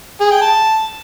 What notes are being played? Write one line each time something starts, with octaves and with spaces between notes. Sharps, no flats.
G#4
G5
A5